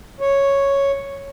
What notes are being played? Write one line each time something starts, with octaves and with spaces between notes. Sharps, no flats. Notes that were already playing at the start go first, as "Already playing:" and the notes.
C#5